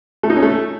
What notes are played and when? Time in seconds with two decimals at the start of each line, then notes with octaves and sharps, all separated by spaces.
0.23 A3
0.30 D#4
0.36 C#4
0.42 A3